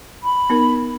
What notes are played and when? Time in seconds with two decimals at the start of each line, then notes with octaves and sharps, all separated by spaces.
0.24 B5
0.50 B3 D#4 A#4